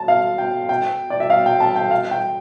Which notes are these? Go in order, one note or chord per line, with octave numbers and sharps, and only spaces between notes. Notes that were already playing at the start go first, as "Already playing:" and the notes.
Already playing: A5
F5
G5
G5
D5
E5
F5
G5
A5
G5
F5
G5